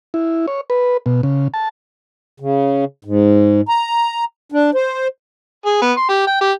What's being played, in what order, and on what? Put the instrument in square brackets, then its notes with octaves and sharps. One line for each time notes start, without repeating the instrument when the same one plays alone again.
[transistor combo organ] E4
C#5
B4
B2
C#3
A5
[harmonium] C#3
G#2
A#5
D4
C5
[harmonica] G#4
B3
C6
G4
G5
G4